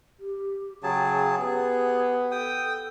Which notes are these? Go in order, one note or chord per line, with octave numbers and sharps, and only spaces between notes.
G4
C#3 F#3 G#4 G5 A5
B3 G4 G#4
A4 G5 D#6